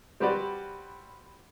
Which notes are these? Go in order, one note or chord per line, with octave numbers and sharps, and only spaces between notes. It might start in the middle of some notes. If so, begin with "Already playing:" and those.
G3 C4 F#4 G4 B4 D5